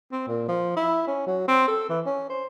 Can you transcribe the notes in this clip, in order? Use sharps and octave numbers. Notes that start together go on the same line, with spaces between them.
C4
A#2
F3
E4
C#4
F#3
C4
A4
E3
C#4
C5